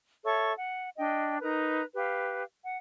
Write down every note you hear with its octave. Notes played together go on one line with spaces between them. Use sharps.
A4 C#5 E5 C#6
F#5
D4 D#5 G5
D#4 A#4 B4 A#5
G4 B4 F5
F#5